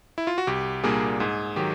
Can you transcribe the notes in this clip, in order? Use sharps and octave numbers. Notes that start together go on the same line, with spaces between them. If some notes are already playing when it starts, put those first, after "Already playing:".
E4
F4
F#4
C2 G4
A#2 G3 A#3 D4 G#4
G#2 G#4
D#3 F#3 G4